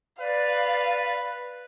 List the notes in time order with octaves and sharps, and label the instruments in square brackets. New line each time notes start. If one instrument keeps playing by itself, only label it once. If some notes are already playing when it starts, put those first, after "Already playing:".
[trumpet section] B4 [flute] D5 [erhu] F5